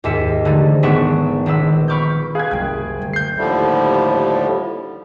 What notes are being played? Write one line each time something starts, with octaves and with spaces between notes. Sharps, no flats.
D#2 G#2 E5 C#7
D3 E3 F3 G3 A3 D#4
G#1 B3 E5 F#5 C#6 D7
A#1 D#3 B3 B4 E6
B5 C#6 D6 F6 G6
G#4 F5 F#6 G#6
F#1 C2 G3 G5 G#6
D2
G6 C7
D#2 A2 D3 F3 G3 A3